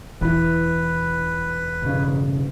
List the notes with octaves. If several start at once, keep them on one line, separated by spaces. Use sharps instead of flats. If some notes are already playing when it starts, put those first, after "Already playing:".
E1 E3 E4 B4
B1 G2 C#3